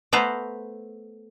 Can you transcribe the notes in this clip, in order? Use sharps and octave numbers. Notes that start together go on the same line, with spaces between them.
A3 B3 B4 C5 A#5